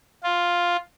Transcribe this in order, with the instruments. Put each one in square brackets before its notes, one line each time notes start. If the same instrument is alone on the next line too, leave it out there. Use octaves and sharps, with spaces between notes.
[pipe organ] F4